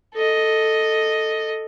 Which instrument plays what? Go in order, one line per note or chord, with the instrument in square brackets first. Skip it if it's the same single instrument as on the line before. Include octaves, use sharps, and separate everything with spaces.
[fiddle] A4 D#5